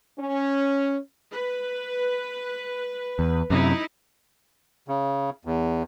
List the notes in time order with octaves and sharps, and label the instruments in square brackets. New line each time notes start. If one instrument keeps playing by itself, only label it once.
[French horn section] C#4
[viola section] B4
[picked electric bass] E2
[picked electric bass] F#2 C3 [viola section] D#4 E4
[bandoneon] C#3
E2